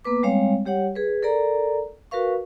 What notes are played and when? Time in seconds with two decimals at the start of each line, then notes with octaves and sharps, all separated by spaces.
0.05 A#3 B3 B4 D6
0.23 G3 G#3 C4 C#5 F5
0.65 G3 G4 C#5 F#5
0.95 G#4 B4
1.23 A4 A#4 D5 A#5
2.11 F#4 A#4 B4 F5 C#6